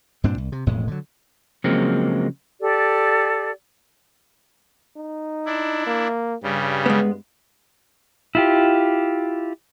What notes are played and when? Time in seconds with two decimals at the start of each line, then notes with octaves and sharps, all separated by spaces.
0.24 G2 A#2 C4 D4
0.38 C2
0.52 C3
0.66 E1 F2 A2 G#3
0.88 D3 F#3
1.64 C#3 F3 F#3 G#3 A#3 C4
2.61 G4 A4 D5
4.97 D#4
5.46 D4 E4
5.87 A#3
6.43 G2 C#3 G3
6.86 G#3 B3
8.35 E4 F4 G4